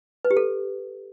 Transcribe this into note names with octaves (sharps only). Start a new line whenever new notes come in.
B4
G4
A4